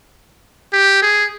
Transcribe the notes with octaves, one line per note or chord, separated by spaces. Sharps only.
G4
G#4